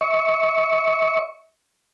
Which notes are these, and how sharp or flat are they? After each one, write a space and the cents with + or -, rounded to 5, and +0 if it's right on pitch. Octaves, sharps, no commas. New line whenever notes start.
E5 -40 C#6 +10